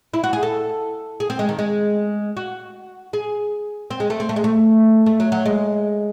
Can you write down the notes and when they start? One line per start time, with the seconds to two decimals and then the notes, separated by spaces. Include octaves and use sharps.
0.14 E4
0.24 F#4
0.33 G#4
0.43 A4
1.20 G#4
1.30 C4
1.39 G#3
1.49 D#3
1.59 G#3
2.37 F#4
3.13 G#4
3.91 C4
4.00 G#3
4.10 A3
4.20 C4
4.29 A3
4.36 G#3
4.44 A3
5.06 A3
5.20 F#3
5.32 F#3
5.46 G#3